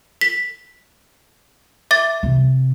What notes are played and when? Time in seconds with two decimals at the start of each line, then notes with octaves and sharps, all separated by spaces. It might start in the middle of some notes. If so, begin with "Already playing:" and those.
0.21 B6
1.91 E5 D6 A6
2.23 C3